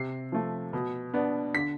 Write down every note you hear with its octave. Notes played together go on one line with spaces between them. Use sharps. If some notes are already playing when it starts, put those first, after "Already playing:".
Already playing: C3 C7
F3 A3
B2
B3 D4
D3 B6